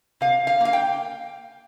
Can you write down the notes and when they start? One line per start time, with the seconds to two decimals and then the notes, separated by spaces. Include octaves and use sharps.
0.21 C3 F5
0.47 F5
0.61 A#3 F5
0.73 G5